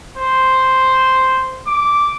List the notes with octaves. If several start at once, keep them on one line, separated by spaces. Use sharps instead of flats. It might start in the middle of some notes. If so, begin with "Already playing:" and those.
C5
D6